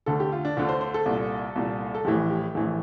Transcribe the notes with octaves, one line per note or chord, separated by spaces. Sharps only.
D2 D3 A4
G4
F4
D4
D2 D3 F4
C5
C5
A4
C2 A#2
C2 A#2
A4
A#1 A2 E3 G4
G4
A#1 A2 E3